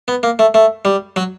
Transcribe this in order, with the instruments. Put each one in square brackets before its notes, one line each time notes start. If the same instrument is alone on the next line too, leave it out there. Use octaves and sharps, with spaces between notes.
[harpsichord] B3
A#3
A3
A3
G3
F#3